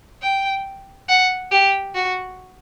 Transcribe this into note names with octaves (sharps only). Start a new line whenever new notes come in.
G5
F#5
G4
F#4